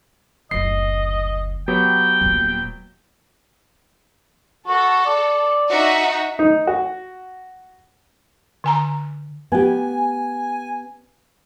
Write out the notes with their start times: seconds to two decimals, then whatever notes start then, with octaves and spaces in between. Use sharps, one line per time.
0.51 F#1 D2 D#5 C7
1.68 F#3 B3 G4 G5
2.21 D#1 A#3
4.67 F#4 A4
5.06 D5
5.70 D#4 F#4 E5
6.39 D#4
6.67 F#4
8.64 D3 G#5 A#5
9.52 B3 G4 G#5